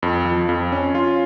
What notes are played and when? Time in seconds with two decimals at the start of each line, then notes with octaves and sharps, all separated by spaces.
0.03 F2
0.25 F3
0.49 F2
0.72 C#4
0.95 F4